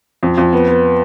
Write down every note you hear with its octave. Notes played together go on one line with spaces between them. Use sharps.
F2
F2
B3
B3